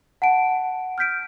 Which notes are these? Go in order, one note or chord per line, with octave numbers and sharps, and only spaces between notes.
F#5 A5 D7
F6 G6 B6 D7